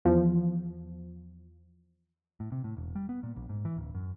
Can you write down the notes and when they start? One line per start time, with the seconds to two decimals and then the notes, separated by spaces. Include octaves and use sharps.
0.05 E2 F3
2.40 A2
2.52 C3
2.64 A2
2.77 E1
2.96 G3
3.09 B3
3.23 A#2
3.36 A#1
3.49 G#2
3.65 E3
3.76 D1
3.94 F#2